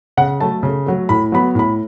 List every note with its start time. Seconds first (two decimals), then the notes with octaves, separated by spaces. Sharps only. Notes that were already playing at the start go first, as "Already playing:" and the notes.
0.17 C#3 F#5
0.40 F#3 A3 A5
0.63 C#3
0.86 F#3 A3
1.09 A2 B5
1.32 F#3 B3 B5
1.55 A2 B5